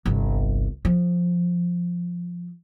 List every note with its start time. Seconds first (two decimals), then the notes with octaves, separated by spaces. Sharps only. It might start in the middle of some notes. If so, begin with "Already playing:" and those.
0.06 G1 C2
0.85 F3